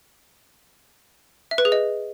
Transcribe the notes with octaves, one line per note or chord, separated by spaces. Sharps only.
E5
B4
G#4
D#5